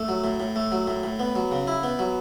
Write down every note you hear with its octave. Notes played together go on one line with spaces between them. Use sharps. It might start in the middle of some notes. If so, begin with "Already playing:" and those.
Already playing: A3
F#3
A2
A2
A3
F#3
A2
A2
B3
F#3
C#3
E4
B3
F#3